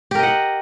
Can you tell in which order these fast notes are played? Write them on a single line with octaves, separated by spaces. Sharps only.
G4 A#4 D#5 F#5